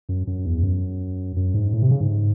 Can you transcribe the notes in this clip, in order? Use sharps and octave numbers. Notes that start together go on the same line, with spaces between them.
F#2
F#2
E2
F#2
F#2
G#2
A2
C3
C#3
G#2